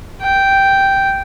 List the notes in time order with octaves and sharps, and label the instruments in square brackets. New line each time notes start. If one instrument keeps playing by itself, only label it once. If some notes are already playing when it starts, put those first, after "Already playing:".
[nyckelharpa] G5